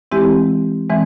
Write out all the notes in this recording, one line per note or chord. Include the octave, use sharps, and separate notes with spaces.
E3 G#3 C4 E4 G4
E3 G#3 C4